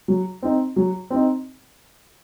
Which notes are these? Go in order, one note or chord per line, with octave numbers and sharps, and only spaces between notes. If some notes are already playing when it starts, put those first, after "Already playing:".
F#3
C4 D#4
F#3
C4 D#4